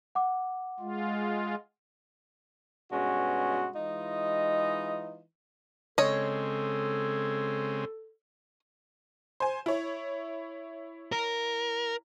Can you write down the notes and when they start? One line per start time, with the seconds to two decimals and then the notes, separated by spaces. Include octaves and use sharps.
0.15 F#5 D6
0.80 G#3 F4
2.92 G2 B2 G#3 C#4 F#4
3.76 E3 G#3 D#4 F4 D#5
5.98 C#3 G#3 C4 A4 C#5 D#5
9.40 C5 G#5
9.66 E4 C#5
11.12 A#4